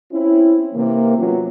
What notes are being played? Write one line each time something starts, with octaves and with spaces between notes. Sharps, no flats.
C4 C#4 E4
C3 E3 A#3
F#3 B3 C#4 F4